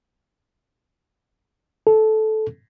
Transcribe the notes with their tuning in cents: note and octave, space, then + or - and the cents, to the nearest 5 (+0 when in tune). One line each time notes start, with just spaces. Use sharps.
A4 -15